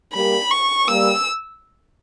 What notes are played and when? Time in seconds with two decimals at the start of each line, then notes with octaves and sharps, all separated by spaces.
0.13 G3 A#3 B5
0.51 C#6
0.88 G3 A#3 E6